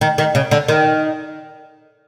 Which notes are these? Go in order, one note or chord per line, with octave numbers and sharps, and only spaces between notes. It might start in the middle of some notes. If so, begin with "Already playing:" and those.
D#3
D#3
C#3
D3
D#3